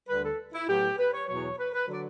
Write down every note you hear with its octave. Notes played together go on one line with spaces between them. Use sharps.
D2 D3 G3 B4
A4
E4
A2 F#3 B3 G4
B4
C#5
E2 B2 F#3 C#5
B4
B4
D3 F#3
D5